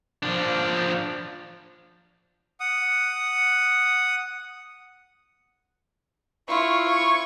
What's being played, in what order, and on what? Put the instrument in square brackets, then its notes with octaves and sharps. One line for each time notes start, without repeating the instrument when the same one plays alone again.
[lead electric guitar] F3 D4
[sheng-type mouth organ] F#5 D#6
[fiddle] E4 F4 [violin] C#6
[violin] C#6 G#6